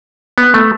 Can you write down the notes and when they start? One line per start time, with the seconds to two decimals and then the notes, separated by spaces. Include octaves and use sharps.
0.38 B3
0.54 A3